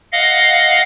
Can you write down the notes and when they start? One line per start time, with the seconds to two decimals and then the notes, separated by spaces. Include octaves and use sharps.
0.12 D#5 F5 F#5